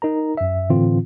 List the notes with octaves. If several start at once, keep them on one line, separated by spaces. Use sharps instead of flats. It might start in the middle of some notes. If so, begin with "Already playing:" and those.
D#4 A#4 A#5
F#2 E5
A2 D3 E3 C4 F4